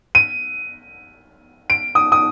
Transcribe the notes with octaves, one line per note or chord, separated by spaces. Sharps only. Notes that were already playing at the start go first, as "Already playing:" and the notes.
D#7
D7
D#6
D#6